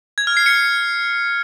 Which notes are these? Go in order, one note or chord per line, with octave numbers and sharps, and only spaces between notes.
G#6
F6
C7
C#7